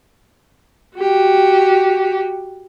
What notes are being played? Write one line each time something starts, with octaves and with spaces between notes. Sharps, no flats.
F#4 G4